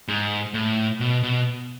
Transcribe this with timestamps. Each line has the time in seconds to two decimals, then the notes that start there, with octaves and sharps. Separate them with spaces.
0.08 G#2
0.54 A2
1.00 B2
1.23 B2